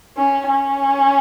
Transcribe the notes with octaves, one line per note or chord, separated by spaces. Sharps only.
C#4
C#4